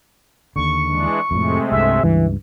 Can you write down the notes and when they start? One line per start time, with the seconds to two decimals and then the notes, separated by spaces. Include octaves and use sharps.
0.56 D#2 D3 C#6
0.88 E3 G#3 D4
1.31 F2 A2 C3 G#3 A3
1.72 C2 G2 E5
2.04 C#2 G2 E3